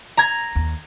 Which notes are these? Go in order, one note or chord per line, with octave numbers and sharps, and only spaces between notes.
A#5 G#6
D#2